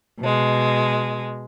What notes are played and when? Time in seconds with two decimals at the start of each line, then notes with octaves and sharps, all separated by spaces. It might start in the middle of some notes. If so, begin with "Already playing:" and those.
0.20 B2 G#3